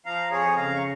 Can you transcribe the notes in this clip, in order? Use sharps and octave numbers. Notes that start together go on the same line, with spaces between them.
F3 F5 A#5
F2 G#4 C#5
C#3 F5 A#5
C#6